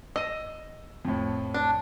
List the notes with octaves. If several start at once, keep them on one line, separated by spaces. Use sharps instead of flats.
D#5 E6 D#7
F2 A2
D4